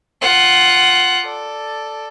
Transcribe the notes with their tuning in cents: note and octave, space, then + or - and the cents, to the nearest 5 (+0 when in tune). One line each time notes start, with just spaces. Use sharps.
F4 +0 F#5 +15
A4 +0 D5 +0